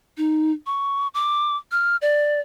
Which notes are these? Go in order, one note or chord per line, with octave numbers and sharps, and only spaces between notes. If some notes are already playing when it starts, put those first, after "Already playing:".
D#4
C#6
D6
F6
D5